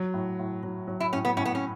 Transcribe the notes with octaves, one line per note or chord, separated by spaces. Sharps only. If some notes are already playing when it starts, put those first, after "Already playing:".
Already playing: F#3
A2
A2
F#3
F#3
E4
A2 C#4
B3
A2 C#4
B3
C#4